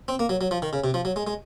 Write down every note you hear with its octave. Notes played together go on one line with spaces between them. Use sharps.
C4
A#3
F#3
F#3
F3
D#3
C#3
C3
F3
F#3
G#3
G#3